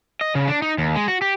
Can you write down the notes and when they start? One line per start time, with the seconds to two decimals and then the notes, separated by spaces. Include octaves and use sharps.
0.21 D#5
0.35 C#3
0.48 D4
0.62 D#4
0.78 D#2
0.96 G#3
1.08 F#4
1.22 G4